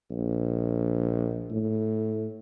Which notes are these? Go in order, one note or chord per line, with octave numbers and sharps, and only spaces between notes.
A#1
A2